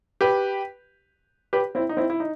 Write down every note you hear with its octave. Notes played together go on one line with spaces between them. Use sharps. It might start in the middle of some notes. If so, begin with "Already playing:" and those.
G4 B4
G4 B4
C4 E4
D#4
C4 E4
E4
D#4